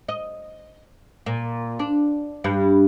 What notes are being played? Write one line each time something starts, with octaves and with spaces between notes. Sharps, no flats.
D#5
A#2
D4
G2